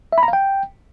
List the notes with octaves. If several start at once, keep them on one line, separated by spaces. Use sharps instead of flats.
E5
B5
A#5
F5
G5